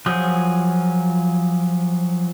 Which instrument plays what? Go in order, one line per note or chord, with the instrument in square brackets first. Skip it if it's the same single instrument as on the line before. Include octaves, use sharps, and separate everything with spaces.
[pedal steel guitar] F3 F#3 G#4 D#6 G6